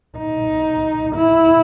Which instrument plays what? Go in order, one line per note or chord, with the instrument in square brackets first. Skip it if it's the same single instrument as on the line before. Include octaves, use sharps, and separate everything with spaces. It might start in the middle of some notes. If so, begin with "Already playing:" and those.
[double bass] D#4
E4